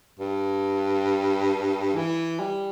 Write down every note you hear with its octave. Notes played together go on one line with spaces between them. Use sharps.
G2
E3
G3